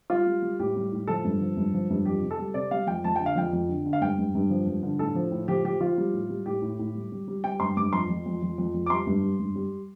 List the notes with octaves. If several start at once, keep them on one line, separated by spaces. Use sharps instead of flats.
G3 F4
G3
G3
A2 G4
G3
A2
F3 A4
G2
F3
G2
F3
G2
F2 G4
C3
A4
G3
C3 D5
G3 F5
F2 G5
F2 A5
D3 G5
F5
F2 G5
F2
D3
D3
F5
G2 G5
G2
G2
F3
G2
D3
A2 A4
F3
A2
F3 G4
F3 G4
F3 F4
G3
A2
G3
A2 G4
A2
A2
G3
G3
G3
G3 G5
G2 C6
G2 D6
F2 C6
F2
F2
F2
F2
F2
D6
G3 C6
G2
G3
G2
G3